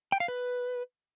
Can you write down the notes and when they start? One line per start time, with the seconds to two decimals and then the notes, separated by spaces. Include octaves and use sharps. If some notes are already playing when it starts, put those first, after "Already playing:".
0.12 G5
0.20 F5
0.28 B4